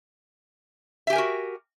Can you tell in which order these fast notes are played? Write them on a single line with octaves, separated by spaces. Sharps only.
E5 G4 G#5 A#4 F#4